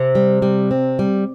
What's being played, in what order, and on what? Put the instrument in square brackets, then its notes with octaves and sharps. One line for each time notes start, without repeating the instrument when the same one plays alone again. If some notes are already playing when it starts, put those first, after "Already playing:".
Already playing: [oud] C3
[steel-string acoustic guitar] G3
G3
C4
G3